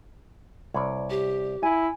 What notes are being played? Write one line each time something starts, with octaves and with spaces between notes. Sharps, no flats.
C2 C#5 D5
G4
E4 G#5